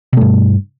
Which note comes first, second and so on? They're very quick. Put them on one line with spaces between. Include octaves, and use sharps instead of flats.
B2 A3 G2